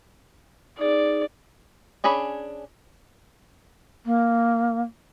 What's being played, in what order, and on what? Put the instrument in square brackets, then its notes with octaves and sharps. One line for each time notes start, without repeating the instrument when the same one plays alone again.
[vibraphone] D#4 G#4 [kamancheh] D5
[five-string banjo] C#4 D4 G#4 B5
[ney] A#3